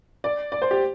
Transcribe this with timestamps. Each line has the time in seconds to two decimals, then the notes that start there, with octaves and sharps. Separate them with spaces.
0.24 D5
0.52 D5
0.62 C5
0.71 G4